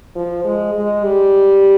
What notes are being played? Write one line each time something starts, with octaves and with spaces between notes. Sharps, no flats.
F3
G#3
G#3
G3